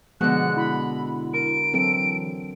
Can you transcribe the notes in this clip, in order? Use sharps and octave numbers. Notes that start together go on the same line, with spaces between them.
B2 D3 F3 G#3 F#5 F#6
E4 B5
A#4 D7
E3 F#3 C4 A4